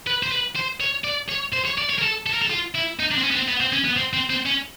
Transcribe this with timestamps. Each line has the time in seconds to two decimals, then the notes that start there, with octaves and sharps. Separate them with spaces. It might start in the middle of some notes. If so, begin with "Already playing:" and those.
0.07 B4
0.23 C5
0.32 B4
0.56 C5
0.81 C#5
1.04 D5
1.29 C#5
1.53 C5
1.65 C#5
1.78 D5
1.90 C#5
1.98 A#4
2.02 A4
2.26 A4
2.34 A#4
2.42 A4
2.51 F4
2.75 E4
3.00 D#4
3.11 D4
3.18 C4
3.24 C#4
3.31 B3
3.36 C4
3.48 B3
3.60 C4
3.73 C#4
3.85 B3
3.97 C4
4.13 C4
4.30 C4
4.45 C#4